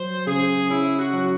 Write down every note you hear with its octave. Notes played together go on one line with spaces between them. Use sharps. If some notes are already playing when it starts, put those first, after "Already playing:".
Already playing: F#3 C5
C#3 G#4
C#4 E4
F#4
F#3